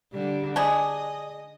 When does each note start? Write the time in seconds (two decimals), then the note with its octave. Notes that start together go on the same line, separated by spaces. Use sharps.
0.12 D3 G3
0.56 D4 G#4 D#5